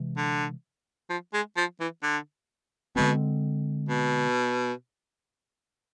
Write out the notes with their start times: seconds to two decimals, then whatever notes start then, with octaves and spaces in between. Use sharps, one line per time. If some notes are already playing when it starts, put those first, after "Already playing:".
Already playing: C3 E3 G#3
0.17 D3
1.10 F3
1.34 G#3
1.57 F3
1.80 E3
2.03 D3
2.96 B2 D3 G#3 C4
3.89 B2